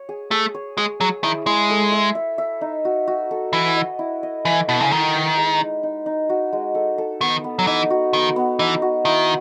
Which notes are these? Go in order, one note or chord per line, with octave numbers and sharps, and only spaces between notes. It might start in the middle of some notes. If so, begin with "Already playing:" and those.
Already playing: C#5
G#4
A3 G#4
C#5
G#3 G#4
F#3 G#4
D#3 E4
G#3 E4
A4
E5
E5
E5
D#4
F#4
F#4
A4
E3 B4
D#5
E4
D#5
E3 B4
B2 E4
C#3
D#3 E4
B4
G#3
D#4
D#4
D#4
F#4
G#3
A4
A4
D#3 B3
B3
F#3
E3 D#4
F#4
D#3 B3
B3
E3 D#4
F#4
D#3 E4